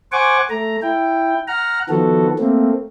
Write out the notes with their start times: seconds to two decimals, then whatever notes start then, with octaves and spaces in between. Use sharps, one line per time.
0.12 C5 F#5 G#5 C#6 D6
0.50 A3 A#5
0.82 E4 G5
1.48 F#5 A#5 F6
1.89 D#3 F3 B3 F#4 A4
2.39 A3 A#3 C4